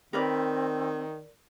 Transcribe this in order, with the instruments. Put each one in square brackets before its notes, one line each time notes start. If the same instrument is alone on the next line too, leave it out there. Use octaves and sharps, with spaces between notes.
[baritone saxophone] D#3 [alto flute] C4 [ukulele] A#4 B4 D5